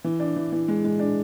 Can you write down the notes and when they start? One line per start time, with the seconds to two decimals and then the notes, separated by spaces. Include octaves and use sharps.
0.04 E3
0.20 D4
0.36 E3
0.52 E3
0.68 G#3
0.85 G#3
0.99 D4